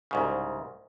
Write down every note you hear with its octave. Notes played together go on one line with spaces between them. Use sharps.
C2 G#2 C#3